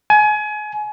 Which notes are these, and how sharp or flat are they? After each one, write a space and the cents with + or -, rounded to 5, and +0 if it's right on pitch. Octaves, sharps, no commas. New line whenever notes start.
G#5 +30